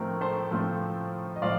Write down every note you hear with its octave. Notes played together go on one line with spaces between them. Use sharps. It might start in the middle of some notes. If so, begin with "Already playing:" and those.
Already playing: A2 F3 A3 C4 A#4
A4 C5
A2 F3 A3 C4 A4 C5
D#5
A2 F3 D5 F5